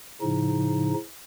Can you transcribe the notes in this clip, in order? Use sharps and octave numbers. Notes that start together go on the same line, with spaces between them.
A2 C#3 F3 D#4